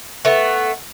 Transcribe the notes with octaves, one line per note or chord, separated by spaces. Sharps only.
A3 B3